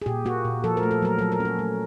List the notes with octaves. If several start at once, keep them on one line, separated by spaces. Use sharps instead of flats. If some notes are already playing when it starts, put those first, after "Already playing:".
G#4
A#2 G4
A#3 F#4
A#2
F3 A4
A#4
A3
A4
F#3 A#4
F#3 A4
A#4
C#4 A4
A3